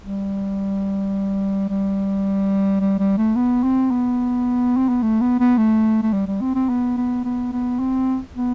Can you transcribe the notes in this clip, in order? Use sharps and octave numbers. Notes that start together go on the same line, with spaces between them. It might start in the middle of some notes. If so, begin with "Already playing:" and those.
G3
G3
G3
G3
A3
B3
C4
B3
C4
B3
A3
B3
B3
A3
A3
G3
G3
C4
C4
B3
B3
B3
B3
C4
B3